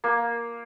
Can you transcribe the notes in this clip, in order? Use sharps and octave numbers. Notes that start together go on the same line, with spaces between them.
A#3